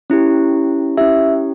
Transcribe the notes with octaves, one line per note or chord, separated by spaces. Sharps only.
C#4 E4 G4
C#4 E4 G4 E5